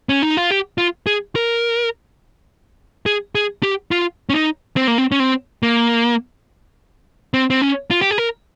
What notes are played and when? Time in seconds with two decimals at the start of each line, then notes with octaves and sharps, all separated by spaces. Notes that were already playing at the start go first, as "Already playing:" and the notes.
0.09 C#4
0.22 D#4
0.37 F4
0.51 G4
0.78 F4
1.07 G#4
1.36 A#4
3.06 G#4
3.35 G#4
3.63 G4
3.91 F4
4.30 C#4
4.35 D#4
4.76 C4
4.87 A#3
4.98 C4
5.12 C#4
5.20 C4
5.63 A#3
7.34 C4
7.50 C4
7.62 C#4
7.91 F4
8.01 G4
8.11 G#4
8.18 A#4